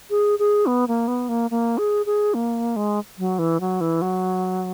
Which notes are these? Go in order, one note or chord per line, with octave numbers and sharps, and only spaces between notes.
G#4
G#4
B3
A#3
B3
A#3
A#3
G#4
G#4
A#3
G#3
F#3
E3
F#3
E3
F#3